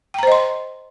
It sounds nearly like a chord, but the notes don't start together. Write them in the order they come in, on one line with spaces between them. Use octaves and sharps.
G5 A#5 C5 D#5 C6